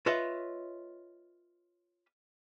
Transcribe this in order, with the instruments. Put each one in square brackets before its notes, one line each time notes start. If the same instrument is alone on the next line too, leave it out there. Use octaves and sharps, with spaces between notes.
[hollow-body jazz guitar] F4 B4 C#5 D#5 E5